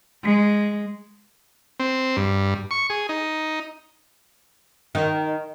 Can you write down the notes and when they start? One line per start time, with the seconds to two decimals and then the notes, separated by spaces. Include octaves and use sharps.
0.24 G#3
1.80 C4
2.17 G2
2.71 C#6
2.90 G#4
3.09 D#4
4.95 D#3